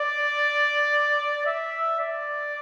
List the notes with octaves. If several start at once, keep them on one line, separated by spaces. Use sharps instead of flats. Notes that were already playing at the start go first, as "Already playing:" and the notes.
Already playing: D5
E5
D5